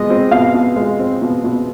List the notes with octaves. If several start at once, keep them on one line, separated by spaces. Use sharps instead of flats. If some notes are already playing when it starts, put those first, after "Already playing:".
Already playing: B2 G#3 D#5
C4
B2 F5
B2
G#3
C4
B2
B2